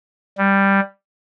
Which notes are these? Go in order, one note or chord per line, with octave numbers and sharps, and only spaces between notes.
G3